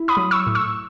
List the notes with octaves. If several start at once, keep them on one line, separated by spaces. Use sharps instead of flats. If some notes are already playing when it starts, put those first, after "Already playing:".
Already playing: E4
B5 D#6
F#3
C#6 E6
A2
C#6 E6